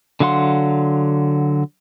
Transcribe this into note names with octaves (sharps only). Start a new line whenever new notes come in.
D3 F#3 F5 F#5 C6